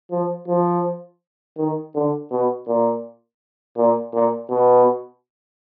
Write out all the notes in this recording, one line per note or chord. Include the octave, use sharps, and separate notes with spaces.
F3
F3
D#3
D3
B2
A#2
A#2
A#2
B2